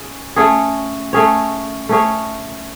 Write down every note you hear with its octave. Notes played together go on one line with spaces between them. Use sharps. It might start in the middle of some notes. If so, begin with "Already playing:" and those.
Already playing: C#4 G#4
A3 C#4 G#4 C#5
A3 C#4 G#4 C#5
A3 C#4 G#4 C#5